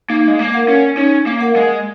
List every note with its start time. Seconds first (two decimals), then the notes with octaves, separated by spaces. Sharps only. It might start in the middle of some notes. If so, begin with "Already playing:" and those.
0.10 A#3 D#4
0.28 G#3
0.39 A#3
0.53 A#4 F#5
0.68 C#4
0.97 C#4 D#4
1.26 A#3
1.41 A#4 F#5
1.56 G#3